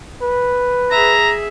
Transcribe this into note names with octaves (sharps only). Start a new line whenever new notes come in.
B4
G#4 E5 A#5